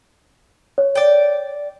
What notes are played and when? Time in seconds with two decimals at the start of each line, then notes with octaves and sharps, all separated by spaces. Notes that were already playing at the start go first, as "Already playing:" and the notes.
0.78 C#5
0.95 D5 G5